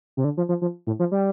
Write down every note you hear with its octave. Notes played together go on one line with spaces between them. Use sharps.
C3
D3
F3
F3
F3
A2
F3
G3